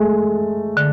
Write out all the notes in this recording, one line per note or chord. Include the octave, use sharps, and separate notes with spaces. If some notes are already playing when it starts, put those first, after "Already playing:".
Already playing: G#3 A3
D3